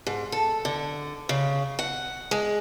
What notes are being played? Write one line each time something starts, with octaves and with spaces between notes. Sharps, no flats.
G#2
A4
D3
C#3
F#5
G#3